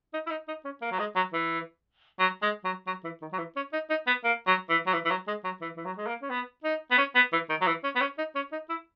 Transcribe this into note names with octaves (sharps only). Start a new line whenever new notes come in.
D#4
E4
D#4
D#4
C#4
A#3
F#3
G#3
F#3
E3
F#3
G#3
F#3
F#3
E3
D#3
F#3
E3
C#4
D#4
D#4
B3
A#3
F#3
E3
F#3
E3
E3
F#3
G#3
F#3
E3
E3
F#3
G#3
A#3
C#4
B3
D#4
B3
C#4
B3
E3
D#3
F#3
E3
C#4
B3
C#4
D#4
C#4
D#4
E4